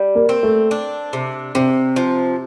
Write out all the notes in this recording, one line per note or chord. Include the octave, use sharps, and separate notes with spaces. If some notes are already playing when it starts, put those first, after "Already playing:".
Already playing: G3
A#3
C4
A3
D4
C3
C3 C4
F3